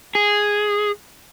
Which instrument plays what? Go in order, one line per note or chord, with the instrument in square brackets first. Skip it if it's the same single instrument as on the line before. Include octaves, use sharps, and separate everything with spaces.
[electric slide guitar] G#4